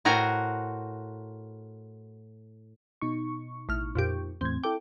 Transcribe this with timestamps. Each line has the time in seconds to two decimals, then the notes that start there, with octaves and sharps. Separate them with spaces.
0.05 A2 F#4 A#4 C5 G#5 A#5
3.01 B2 D#4 C#6
3.69 A1 F6
3.95 F2 A#2 G4
4.41 E2 A2 C4 G#6
4.63 E4 A4 G5 D6